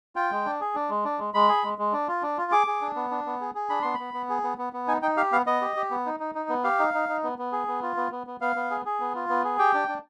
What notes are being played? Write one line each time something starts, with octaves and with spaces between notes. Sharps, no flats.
F4 G5
G#3
D4
G#4
D4
G#3
D4
G#3
G#3 B5
G#4
G#3
G#3
D4
F4
D4
F4
G#4 D6
G#4
D4
B3
D4
B3
G#4
G#4
D4 B5
B3 C6
B3 B5
B3
G#4
B3
B3
B3
D#4 G#5
D#4 G5
G4 F5
B3 F5
B3 D#5
G4
G4
B3
D#4
D#4
D#4
B3
G4 F5
D#4
D#4
D#4
B3
B3
G#4
B3
F4
B3
B3
B3
B3 F5
B3
G#4
G#4
B3
F4
B3
G#4
G4 G5
D4
D4